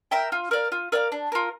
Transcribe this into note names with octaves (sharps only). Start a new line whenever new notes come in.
A#4 E5 G5
F4
A#4 D5 F5
F4
A#4 D5 F5
D4
F4 A#4